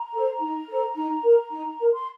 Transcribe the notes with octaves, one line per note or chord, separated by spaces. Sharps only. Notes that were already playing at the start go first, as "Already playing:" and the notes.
Already playing: A#5
A4 C5
D#4
A4 C5
D#4
A#4
D#4
A#4
C6